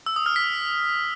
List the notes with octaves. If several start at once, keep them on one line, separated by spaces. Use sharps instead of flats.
E6
D#6
F6
B6